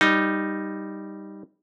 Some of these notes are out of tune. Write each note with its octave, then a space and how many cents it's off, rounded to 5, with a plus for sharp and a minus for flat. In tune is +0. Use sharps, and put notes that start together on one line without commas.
G3 +0 D#4 +0